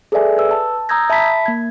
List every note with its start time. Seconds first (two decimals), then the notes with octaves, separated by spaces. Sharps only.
0.12 G#4 A4 B4 D5 E5 G#5
0.38 B4 E6
0.51 A5
0.89 A#5 D#6 E6 G6 G#6 A#6
1.10 E5 A5 B5 B6
1.46 A#3 G#6